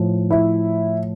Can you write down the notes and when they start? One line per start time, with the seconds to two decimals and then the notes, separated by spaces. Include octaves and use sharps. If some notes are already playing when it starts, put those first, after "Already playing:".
Already playing: A2 F3
0.31 E4